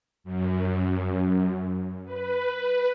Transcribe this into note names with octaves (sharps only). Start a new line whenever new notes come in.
F#2
B4